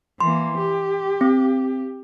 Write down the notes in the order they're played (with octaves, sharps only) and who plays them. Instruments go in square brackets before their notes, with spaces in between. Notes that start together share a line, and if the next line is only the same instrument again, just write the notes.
[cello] E3 A#3 [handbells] C6
[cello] G4
[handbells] C4